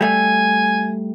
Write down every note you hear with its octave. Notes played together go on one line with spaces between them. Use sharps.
G3 A3 G#5